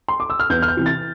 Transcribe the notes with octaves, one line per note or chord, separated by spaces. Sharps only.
C6
D6
E6
F6
E2 G6
F6
G6
C3 E3
A6